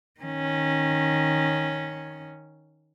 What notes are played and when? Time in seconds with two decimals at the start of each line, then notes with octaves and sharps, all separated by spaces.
0.21 D#3 C#4